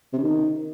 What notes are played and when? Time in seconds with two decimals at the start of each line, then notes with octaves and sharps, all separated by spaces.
0.13 C3
0.18 C#3
0.23 D#3